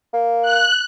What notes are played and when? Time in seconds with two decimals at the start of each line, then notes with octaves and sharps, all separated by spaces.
0.14 A#3
0.42 F#6